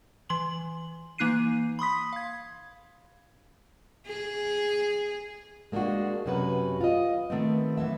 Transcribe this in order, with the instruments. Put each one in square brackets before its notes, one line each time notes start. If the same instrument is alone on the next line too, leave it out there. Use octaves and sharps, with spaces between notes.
[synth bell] E3 C6 F#7
E3 A#3 D#4 F#6 C7 D#7
B5 C6 D#6 B6
F5 G#6
[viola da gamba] G#4
[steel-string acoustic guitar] G#3 A#3 D4 E4 F#4
F#2 C3 C#4 F#4 B4
F4 D#5
D#3 A3 B3 C4
F#2 E3 B3 E5